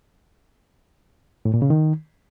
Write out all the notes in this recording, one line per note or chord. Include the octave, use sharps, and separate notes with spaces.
A2
A#2
C#3
D#3